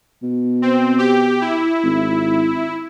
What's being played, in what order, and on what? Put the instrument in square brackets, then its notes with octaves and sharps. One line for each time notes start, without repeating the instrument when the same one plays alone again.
[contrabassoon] B2
[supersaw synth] C4
G4
E4
[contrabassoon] G#1